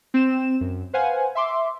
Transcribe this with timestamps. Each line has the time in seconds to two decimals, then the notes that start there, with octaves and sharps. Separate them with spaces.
0.14 C4 E7
0.61 F#2
0.93 B4 C5 F5 F#5 G#5
1.35 E5 C6 D6